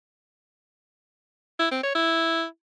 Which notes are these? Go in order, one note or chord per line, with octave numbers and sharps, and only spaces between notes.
E4
C4
C#5
E4